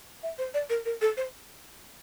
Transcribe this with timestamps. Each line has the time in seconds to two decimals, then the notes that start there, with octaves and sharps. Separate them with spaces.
0.23 E5
0.38 C5
0.54 D5
0.69 A#4
0.85 A#4
1.01 A4
1.17 C5